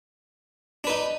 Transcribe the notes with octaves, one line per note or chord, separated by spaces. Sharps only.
D4 D#4 B4